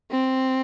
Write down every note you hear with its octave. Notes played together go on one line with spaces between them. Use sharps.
C4